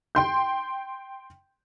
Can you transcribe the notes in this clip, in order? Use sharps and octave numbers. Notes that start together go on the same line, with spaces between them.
G5 C6 G6